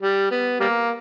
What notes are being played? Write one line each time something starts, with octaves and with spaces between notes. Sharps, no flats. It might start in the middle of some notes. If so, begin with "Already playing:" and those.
G3
B3
G3 A#3